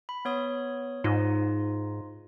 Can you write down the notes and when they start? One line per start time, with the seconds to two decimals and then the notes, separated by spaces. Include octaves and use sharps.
0.09 B5
0.25 B3 C#5 D#6
1.04 G#2 D#4 F4